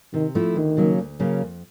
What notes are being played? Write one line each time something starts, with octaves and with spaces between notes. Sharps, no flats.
C3 D#3
F3 A3 C4 E4
D2 D#3
C#3 F#3 A#3 C#4
D2
C#3 F#3 A#3 C#4
F2